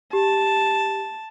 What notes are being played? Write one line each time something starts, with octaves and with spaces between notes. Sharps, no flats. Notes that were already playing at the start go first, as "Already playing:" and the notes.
G4 A5